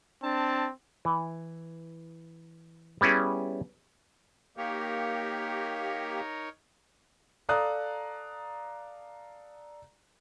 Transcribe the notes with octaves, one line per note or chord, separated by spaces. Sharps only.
C4 D4 A5
E3
G3 B3 C#4 E4 G#4
A#3 D#4 G4 A#4 C#5
A4 D5 F5 A#5 D#6 F#6